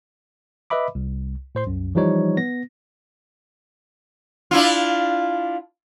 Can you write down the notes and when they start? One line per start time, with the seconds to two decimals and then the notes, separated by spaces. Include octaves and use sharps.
0.70 B4 D#5 E5 B5 D6
0.95 C2
1.55 A2 C5 C6
1.67 C2 F#2
1.95 E3 F3 G3 D#4 C#5
2.37 B3 A#6
4.51 D4 E4 F4